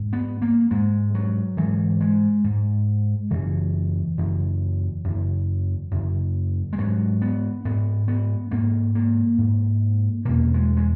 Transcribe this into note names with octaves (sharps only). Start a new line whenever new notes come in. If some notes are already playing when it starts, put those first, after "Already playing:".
Already playing: G#2
B3
A#3
G#2 G#3
F#3
G#2 E3
G#3
G#2
F#2 C#3 E3
F#2 C#3
F#2 C#3
F#2 C#3
G#3
G#2 F#3
B3
G#2 B3
B3
G#2 A#3
A#3
G#2
E2 B2 A#3
G#3
G#3